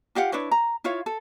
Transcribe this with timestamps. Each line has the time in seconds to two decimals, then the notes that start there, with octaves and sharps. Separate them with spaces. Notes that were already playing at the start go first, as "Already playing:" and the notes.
0.15 F4 G4 F5 F#5
0.32 D4 E4 B4 C#5
0.51 A#5
0.84 E4 F4 C#5 F5
1.06 A4